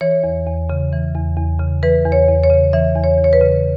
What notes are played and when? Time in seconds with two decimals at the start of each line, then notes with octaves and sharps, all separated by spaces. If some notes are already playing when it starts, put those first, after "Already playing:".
0.01 E3 C#5
0.24 E2
0.47 E2
0.70 C#3
0.93 E3
1.14 E2
1.37 E2
1.60 C#3
1.83 E3 B4
2.05 E2
2.12 C#5
2.28 E2
2.43 C#5
2.50 C#3
2.73 E3 E5
2.96 E2
3.04 C#5
3.18 E2
3.24 C#5
3.33 B4
3.41 C#3